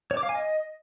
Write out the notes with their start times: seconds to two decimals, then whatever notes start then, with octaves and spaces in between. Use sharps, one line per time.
0.11 C#5
0.17 D6
0.23 F5
0.29 G#5
0.35 D#5